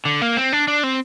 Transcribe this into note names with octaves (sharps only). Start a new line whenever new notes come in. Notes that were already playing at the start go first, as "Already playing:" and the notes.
D3
A#3
C4
D4
D4
C4